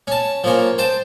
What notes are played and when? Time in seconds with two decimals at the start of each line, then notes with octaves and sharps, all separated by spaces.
0.07 C#4 A5
0.44 F3 A#3 C#4
0.78 C5 G5 A5